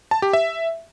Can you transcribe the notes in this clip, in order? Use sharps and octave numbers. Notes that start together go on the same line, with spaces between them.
A5
G4
E5